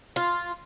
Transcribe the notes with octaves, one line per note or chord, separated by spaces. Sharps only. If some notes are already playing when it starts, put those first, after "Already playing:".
F4